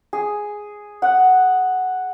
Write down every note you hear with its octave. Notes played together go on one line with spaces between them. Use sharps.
G#4
F#5